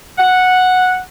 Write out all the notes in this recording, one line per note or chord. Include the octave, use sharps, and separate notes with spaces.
F#5